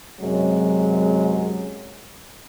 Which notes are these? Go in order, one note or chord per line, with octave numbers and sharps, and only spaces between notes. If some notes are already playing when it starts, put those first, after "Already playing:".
F#2 C3 F#3 G#3